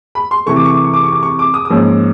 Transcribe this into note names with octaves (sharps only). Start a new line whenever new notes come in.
B5
C6
C3 E3 A3 C#6
D6
C#6
D6
C#6
D6
C#6
D6
C#6
D6
D#6
D#6
G#2 F3 A#3 C#4 E6